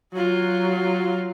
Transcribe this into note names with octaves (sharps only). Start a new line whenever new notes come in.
F#3 F4